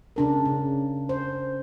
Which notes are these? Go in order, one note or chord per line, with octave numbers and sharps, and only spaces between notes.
C#3 D4 A#4
C#3
C5